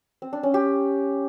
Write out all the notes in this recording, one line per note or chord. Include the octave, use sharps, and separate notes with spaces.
C4
D4
C#4
G4